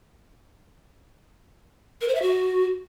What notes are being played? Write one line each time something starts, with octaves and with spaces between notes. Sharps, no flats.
A#4
C5
E5
F#4